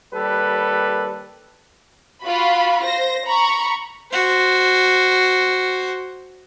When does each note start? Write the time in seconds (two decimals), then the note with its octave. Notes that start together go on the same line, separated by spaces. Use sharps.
0.14 D#2 G3 A4 B4
2.23 F4 F#4 B5
2.84 C5 A#6
3.26 A#5 B5 C#6
4.12 F#4 C5